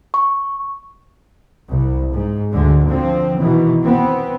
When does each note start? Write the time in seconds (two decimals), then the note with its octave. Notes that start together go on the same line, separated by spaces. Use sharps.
0.14 C#6
1.66 C2
2.12 G#2
2.50 D2 D3 G#3
2.87 D3 F3 C4
3.38 B2 D#3 E3
3.82 B3 C4